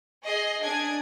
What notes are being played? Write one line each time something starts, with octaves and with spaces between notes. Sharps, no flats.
G#4 D#5 C7
D4 G#5 D#6 G#6